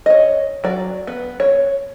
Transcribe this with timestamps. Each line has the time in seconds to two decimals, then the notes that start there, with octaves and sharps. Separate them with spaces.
0.06 C#5 D#5
0.64 F#3 D5
1.07 B3
1.40 C#5